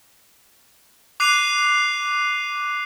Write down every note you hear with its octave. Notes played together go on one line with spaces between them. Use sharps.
D6 F#6 C7 D#7 F7